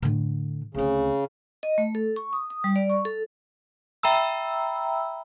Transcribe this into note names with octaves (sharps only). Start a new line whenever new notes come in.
A2 D3
D2 C#3 C4
D#5
A3
A4
C#6
D#6
D#6
G3
D5
C#6
A4
E5 G5 A#5 B5 E6